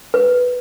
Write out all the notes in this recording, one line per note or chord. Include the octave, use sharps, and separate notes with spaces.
B4